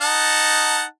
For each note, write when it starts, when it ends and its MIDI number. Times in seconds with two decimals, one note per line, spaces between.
0.01 0.84 63
0.01 0.84 78
0.01 0.84 81